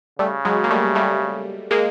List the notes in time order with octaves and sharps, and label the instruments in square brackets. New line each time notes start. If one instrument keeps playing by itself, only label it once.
[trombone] C#3 [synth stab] G3 A3
[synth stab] F#3 G#3
A#3
G3 A3
G3 A3
G#3 A#3